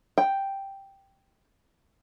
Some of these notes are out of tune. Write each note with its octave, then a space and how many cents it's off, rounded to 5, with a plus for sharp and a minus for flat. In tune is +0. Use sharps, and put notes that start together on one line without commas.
G5 +0